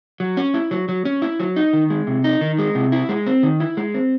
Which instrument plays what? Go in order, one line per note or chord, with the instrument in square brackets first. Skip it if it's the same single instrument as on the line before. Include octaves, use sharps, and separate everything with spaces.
[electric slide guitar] F#3
C#4
E4
F#3
F#3
C#4
E4
F#3
D#4
D#3
G#3
C3
D#4
D#3
G#3
C3
E4
G#3
C4
D#3
E4
G#3
C4